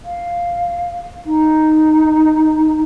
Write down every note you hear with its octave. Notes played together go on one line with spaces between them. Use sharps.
F5
D#4